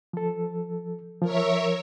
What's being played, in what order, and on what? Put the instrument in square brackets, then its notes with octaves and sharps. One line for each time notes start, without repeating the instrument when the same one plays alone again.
[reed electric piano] F3 A4
[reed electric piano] F3 [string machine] A#4 C#5 E5